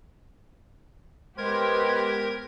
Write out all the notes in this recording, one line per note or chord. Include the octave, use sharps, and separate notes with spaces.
G#3 B3 G4 A#4 C5 G#6